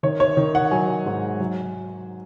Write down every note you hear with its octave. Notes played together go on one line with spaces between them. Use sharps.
D#3 C#5
C#5
D#3
F#5
F#3 G#5
G#2
F#3